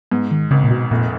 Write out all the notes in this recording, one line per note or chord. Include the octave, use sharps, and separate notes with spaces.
G#2 B3
D#3
G#1 C#3
A#2
B2
F1 A#2